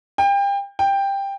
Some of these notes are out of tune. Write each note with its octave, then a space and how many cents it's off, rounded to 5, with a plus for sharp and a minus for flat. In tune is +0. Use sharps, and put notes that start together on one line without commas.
G5 +30
G5 +10